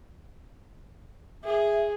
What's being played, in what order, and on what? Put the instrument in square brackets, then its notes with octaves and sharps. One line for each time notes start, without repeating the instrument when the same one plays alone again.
[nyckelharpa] G#4 [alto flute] E5